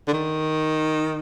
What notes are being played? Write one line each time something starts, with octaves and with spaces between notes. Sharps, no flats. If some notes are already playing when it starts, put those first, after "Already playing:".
D3
D#3